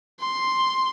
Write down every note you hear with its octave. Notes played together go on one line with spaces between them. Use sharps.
C6